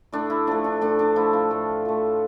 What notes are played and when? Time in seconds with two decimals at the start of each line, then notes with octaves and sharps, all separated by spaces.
0.12 A2 D4
0.30 E4
0.47 F3 A3 D4
0.64 D4
0.81 A2 D4
0.99 D4
1.16 F3 A3 E4
1.33 F4
1.51 A2
1.85 F3 A3